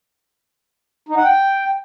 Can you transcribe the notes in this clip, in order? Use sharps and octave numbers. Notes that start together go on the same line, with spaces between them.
D#4
F#5
G5